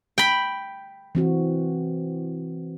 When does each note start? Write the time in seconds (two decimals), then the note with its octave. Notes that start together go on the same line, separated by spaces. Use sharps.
0.18 G5 B5
1.15 E3 C4 F#4